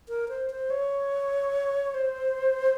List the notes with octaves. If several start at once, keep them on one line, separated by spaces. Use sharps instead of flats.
A#4
C5
C5
C#5
C5